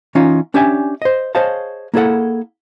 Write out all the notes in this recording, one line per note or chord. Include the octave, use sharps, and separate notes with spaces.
E3 C#4 D#4 F4
C#4 D4 G4 D5 E5 G#5
C5 D#5
G#4 C5 C#5 D#5 F5 A5
A#3 E4 G#4 A4 F#5